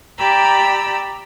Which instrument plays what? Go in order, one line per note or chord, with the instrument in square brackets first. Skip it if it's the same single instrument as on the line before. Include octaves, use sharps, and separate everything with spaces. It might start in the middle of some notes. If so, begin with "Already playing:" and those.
[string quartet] G4 D5 G5 A#5 B5 E6